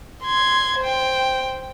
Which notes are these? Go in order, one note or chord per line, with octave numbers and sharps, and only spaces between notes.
C6 G#6
C5 G5